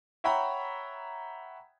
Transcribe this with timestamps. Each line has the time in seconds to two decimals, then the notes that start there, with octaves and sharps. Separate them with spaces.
0.24 C#5 E5 F#5 G5 A#5 B5